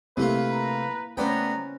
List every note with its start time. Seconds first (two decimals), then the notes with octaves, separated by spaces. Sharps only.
0.17 C3 A3 A#3 E4 F4 B4
0.50 A#5
1.17 A3 B3 C#4 D4 B4 C5 G5 A#5